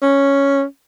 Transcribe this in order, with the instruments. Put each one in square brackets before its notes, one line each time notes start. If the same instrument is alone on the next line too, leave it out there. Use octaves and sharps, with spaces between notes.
[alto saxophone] C#4